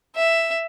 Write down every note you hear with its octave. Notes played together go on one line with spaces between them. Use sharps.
E5